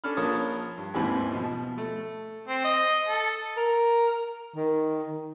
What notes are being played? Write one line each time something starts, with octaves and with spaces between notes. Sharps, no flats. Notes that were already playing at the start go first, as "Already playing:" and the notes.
C#4 D4 A4 B5 F6
A#1 F3 A#4 C#5 A5 D#6
G2
A1 D#2 G#2 E3 C4 B5
B2 F3
A3
C4
D#5
A4
A#4
D#3